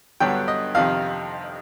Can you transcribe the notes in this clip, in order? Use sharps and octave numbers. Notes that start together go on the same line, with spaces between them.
G2 D3 F#3 B3 G5
D#5
F2 C3 D#3 F5